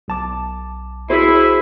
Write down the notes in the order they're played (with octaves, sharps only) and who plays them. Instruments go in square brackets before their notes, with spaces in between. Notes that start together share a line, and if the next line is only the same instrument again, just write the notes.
[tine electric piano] B1 A5 D6
[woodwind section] E4 [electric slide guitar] F#4 G#4 C5